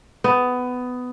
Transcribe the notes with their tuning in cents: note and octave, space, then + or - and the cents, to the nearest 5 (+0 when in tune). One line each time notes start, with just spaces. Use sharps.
B3 +15